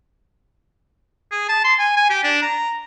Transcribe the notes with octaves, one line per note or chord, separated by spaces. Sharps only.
G#4
A5
C6
G#5
G#5
G4
D4
A#5